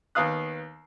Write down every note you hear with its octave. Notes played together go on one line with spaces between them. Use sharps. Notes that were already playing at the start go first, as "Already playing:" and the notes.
D#2 B3 F5 D#6 F#6